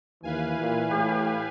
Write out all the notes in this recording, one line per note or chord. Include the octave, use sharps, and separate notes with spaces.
D#2 E3 B4 F5 G#5
A#2
A2 G4